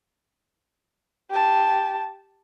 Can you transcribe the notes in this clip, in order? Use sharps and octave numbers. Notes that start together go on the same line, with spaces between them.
G4 A5